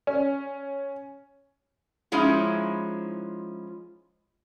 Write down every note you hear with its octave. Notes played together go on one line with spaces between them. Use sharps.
C#4
F3 G#3 C#4 D#4 E4